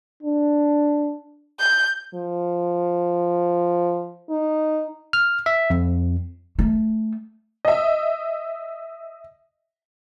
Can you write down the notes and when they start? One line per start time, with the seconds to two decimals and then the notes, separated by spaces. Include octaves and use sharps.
0.23 D4
1.60 G6
2.14 F3
4.30 D#4
5.13 F6
5.46 E5
5.70 F2
6.59 A3
7.65 D#5 E5